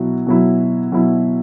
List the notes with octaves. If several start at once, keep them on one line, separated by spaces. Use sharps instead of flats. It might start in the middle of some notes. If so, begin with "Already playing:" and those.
Already playing: B2 F#3 E4
B2 F#3 E4
B2 F#3 E4